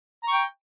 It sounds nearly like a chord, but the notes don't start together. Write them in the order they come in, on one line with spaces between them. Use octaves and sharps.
A#5 C#6 G5